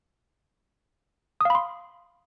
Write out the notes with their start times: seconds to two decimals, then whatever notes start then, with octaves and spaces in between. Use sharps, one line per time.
1.41 D#6
1.45 F5
1.50 B5
1.55 C6